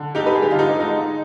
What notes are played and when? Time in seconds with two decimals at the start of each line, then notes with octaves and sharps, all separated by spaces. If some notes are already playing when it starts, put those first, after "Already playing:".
Already playing: D3
0.15 D#4 G4
0.22 G3 B4
0.35 G#4
0.42 G4
0.51 D3 F4
0.59 D#4
0.80 G#3 D#4